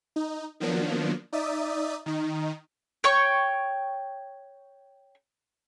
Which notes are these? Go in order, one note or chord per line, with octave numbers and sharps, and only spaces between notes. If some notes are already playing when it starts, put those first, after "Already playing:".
D#4
D#3 F3 F#3 A#3 B3 D4
D#4 D5 E5 D#6
D#3 D#4
C#5 G5 C#6